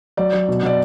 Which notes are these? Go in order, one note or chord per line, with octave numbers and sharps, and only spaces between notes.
F#3 D5
F#3
B2
B2 D5